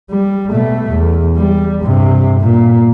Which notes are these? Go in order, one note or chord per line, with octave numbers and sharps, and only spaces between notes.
G3
B2 A3
E2
G3
G2 C3
A#2